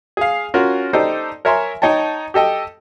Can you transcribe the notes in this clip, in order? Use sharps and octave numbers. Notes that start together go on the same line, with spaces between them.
G#4 F5
C#4 F4 F#4 A#4
D#4 G4 A4 C5 D5
A#4 C#5 E5 G#5 A#5 C6
D#4 C#5 G5 A5
G4 A4 D#5 G5